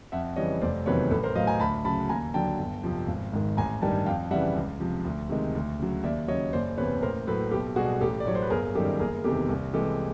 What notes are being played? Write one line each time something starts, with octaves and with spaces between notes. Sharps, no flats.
F2 E5 F#5
C#3 E3 G3 C#5 D#5
F1 C5 D5
E2 C3 D#3 F#3 B4 C#5
A1 A4 B4
A#4 C5
A2 F#3 D#5 F5
G#5 A#5
D2 A5 B5
C#3 F#3 A5 B5
D#2 G#5 A#5
D3 F#3 G5 A5
G1
F2 C3 F3
G#1
G#2 D#3
A1 G#5 A#5
G2 D#3 G3 G5 A5
F2 F5 G5
C#3 E3 G3 E5 F#5
C#2
C3 F3
D2
C3 D#3 G#3
D2
C#3 F#3
D#2 D5 E5
C#3 F#3 C#5 D#5
F#1 C5 D5
E2 C3 B4 C#5
A1 A#4 C5
A2 F#3 A4 B4
B1 G4 A4
B2 G3 F#4 G#4
A1 G4 A4
D5
A2 F#3 C#5
C5
B4
G1 G#4 A#4
F#2 D#3 G3 G4 A4
F#1 G#4 A#4
E2 C3 D#3 G4 A4
C2
C3 E3 G#3 G4 A4